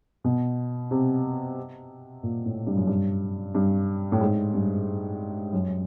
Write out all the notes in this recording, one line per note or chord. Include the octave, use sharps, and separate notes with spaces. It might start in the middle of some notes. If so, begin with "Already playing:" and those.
B2
C3
A#2
A2
G2
F#2
G2
G2
A2
G#2
G2
F#2